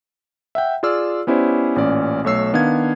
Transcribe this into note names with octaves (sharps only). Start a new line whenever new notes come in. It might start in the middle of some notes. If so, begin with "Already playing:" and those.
E5 F#5 G5
F4 G#4 D5 E6 F6
B3 C#4 E4 G4 C5 D5
A1 A#2 C#4 D5
B1 A3 C#5 E6 C7
D#3 B3 D4 F5 G#6